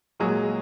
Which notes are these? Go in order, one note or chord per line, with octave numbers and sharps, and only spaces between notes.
A#2 F#3 G#3 G#4